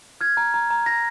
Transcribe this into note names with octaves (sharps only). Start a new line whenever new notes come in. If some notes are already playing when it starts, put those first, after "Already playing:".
F6 G#6
A#5
A#5
A#5
A#5 A#6